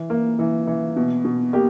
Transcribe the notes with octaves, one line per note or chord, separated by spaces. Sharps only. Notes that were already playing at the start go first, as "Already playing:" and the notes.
Already playing: E3
A#3
E3
E3
B2
B2
A#3 G4